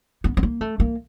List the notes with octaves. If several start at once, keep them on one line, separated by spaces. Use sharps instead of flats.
B3
B3
A#3
A3
A#3